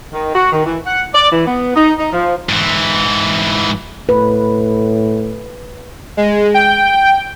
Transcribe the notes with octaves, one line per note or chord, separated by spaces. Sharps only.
D#3
F#4
D#3
E3
F#5
D5
E3
B3
D#4
D#4
F3
G#2 E3
A2 B4
G#3
G5